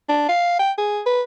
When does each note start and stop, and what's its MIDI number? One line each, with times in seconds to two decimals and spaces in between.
0.09 0.26 62
0.29 0.55 77
0.59 0.72 79
0.78 1.01 68
1.06 1.22 71